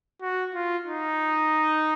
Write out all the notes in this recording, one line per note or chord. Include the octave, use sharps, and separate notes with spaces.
F#4
F4
D#4